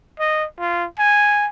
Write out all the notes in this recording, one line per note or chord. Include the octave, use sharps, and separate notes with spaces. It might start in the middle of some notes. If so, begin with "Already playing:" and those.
D#5
F4
G#5